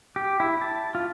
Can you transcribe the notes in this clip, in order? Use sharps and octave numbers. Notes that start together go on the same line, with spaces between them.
G4
E4
A5
F4